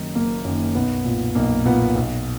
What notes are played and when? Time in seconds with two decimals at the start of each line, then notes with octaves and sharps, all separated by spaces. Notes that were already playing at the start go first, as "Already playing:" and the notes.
Already playing: F#1 F#2 D#3 D#4
0.15 F#1 A#3
0.45 F#2 D#3
0.75 B1 B3
1.05 A#2
1.35 B1 A#3
1.65 A#2 B3
1.96 B1